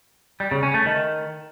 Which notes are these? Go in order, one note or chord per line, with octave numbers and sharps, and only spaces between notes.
G3
C#3
C#4
A3
D#3